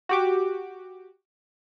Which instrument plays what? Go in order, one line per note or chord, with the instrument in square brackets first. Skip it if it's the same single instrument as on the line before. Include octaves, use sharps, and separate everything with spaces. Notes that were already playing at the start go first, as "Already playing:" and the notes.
[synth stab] F#4 G4 D6